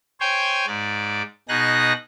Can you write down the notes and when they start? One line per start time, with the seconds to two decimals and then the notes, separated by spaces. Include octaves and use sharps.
0.20 C5 C#5 G5 G#5
0.67 G#2 D5
1.49 B2 D#4 G#4 F#6 A#6